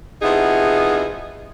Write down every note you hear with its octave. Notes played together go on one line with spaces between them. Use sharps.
C3 F3 B3 D#4 E4 G#4